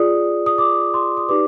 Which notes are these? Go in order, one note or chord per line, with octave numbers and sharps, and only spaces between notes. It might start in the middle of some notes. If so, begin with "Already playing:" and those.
Already playing: F4 G#4 D5 D#6
D#6
D6
C6
D#6
D#4 G4 B4 D5 D6